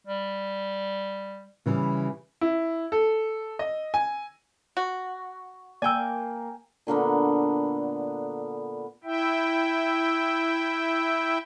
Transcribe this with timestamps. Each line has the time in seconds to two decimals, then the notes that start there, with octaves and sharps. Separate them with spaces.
0.07 G3
1.66 C#3 E3 G3
2.41 E4
2.92 A4
3.59 D#5
3.94 G#5
4.77 F#4
5.82 A#3 D5 G5 G#5 E6
6.87 A#2 D3 A#3 B3
9.04 E4 E5 G5